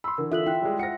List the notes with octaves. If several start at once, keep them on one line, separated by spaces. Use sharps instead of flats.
B5 C6 E6
D3 E3 A#4
F4 A4 E5 F#6 F#7
E4 G5 F#6
G3 G#3
F4 C5 F#5 A#6 C#7